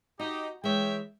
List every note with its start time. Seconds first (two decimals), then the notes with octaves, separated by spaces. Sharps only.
0.19 D#4 F#4 G4
0.64 E3 G#3 C#5 E5 G5